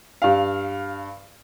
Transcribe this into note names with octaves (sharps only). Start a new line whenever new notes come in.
G2 F5